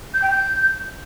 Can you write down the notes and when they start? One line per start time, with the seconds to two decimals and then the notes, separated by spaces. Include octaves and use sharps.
0.14 G6
0.22 G5
0.31 G6